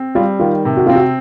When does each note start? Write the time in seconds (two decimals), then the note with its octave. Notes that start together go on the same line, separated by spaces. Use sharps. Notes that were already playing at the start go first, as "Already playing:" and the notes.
Already playing: C4
0.15 G3 F4
0.40 D#3 F4
0.65 C3
0.77 F#4
0.87 C4 F4
0.96 F#4